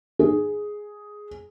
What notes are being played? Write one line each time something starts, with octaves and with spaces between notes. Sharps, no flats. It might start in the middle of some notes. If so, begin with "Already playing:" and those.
G#4